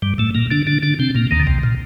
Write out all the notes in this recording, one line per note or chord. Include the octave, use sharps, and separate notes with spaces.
G2 G3
A2 A3
A#2 A#3
D3 D4
D3 D4
D3 D4
C3 C4
A#2 A#3
D#2 D#3
D3
C2 C3
A#2